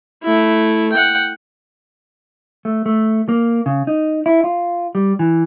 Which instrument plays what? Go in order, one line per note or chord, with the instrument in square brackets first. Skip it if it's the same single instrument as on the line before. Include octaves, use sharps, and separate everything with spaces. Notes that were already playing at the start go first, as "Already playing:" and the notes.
[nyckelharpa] A3 E4
F#5 G5
[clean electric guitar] A3
A3
A#3
C#3
D#4
E4
F4
G3
E3